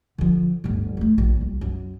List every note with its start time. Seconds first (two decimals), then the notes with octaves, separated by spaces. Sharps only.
0.18 D3 F3
0.64 D1 G1
0.97 F2 A3
1.18 A#1
1.41 C2
1.61 F#2